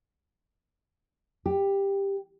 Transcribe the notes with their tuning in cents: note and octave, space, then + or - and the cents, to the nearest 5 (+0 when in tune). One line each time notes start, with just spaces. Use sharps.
G4 +10